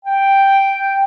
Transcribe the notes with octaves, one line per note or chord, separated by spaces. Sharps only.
G5